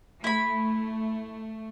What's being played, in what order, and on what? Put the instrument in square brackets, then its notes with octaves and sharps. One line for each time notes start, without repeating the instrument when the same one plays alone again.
[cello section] A3 [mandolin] E4 B5